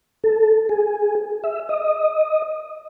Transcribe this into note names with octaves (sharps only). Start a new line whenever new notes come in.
A4
G#4
E5
D#5